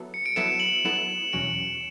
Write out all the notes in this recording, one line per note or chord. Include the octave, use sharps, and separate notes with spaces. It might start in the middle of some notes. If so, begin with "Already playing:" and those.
Already playing: F#3 B3 E4 A4
C#7
D7
F#3 B3 E4 A4 E7
F#7
F#3 B3 E4 A4 E7
E2 B2 F#3 C#4 F#4 D7